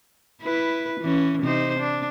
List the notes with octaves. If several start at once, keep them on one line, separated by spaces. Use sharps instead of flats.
E4 B4
E3 C#4
C3 D#4 C5
D4